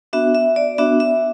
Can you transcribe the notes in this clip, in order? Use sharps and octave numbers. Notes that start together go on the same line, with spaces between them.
B3 D4 F#4 E5
E5
D5
B3 D4 F#4 E5
E5